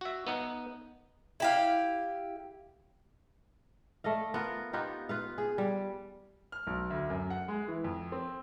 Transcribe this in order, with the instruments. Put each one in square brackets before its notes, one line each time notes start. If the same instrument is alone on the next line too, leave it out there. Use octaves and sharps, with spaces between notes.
[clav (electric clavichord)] F#4 E5
B3 D#4 F#5
[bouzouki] E4 G4 F5
[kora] A3 D5 D#5 F5
B3 F4 A#4
B3 D#4 F4 G4
F4 B4 F5
G#4
G3
[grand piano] F6
B1
D2
F#2
F#5
G#3
E3
F2
C4